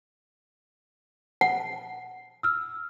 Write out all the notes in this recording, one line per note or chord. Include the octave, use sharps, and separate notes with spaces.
F#5
E6 F6